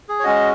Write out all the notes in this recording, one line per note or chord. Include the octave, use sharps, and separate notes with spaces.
G#4
C#5
G#3 C#4 F#4 D#5